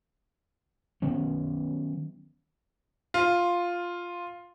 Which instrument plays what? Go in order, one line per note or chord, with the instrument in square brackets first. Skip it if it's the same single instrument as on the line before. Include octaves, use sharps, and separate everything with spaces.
[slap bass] D#3 F#3 B3 C#4
[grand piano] F4